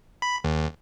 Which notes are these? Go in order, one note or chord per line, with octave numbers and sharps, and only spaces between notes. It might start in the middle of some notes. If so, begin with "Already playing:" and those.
B5
D#2